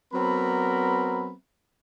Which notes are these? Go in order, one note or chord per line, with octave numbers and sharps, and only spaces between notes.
F#3 B3 C4 A#4 B5